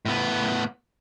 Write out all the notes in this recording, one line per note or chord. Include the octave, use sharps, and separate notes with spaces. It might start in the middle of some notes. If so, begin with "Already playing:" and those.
A2 B3